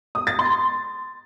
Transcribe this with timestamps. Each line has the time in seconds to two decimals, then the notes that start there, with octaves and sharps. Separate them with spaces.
0.15 D#6
0.27 A6
0.39 C6